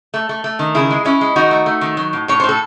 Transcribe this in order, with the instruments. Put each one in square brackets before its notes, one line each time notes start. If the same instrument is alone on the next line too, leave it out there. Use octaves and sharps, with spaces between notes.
[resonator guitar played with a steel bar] A3
A3
A3
D#3
C#3 E4 G#4
G#3
G#3 C#4 E4
G#3
D#3 D#4 F#4
A3
A3
D#3
F#3
A2
A2 C#5
C5
A2 A4